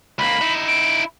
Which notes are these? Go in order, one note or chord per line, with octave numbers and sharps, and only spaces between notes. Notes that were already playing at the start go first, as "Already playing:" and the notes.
C#2 A#3 B5
D#4 E4
D7